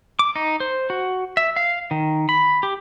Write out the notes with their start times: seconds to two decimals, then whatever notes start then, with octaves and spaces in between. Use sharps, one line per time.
0.19 D6
0.36 D#4
0.60 C5
0.90 F#4
1.37 E5
1.56 F5
1.91 D#3
2.29 B5
2.63 G4